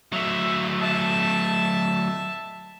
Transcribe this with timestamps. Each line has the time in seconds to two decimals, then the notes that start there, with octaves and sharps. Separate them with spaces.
0.13 F#3 A3 E5
0.81 E5 A5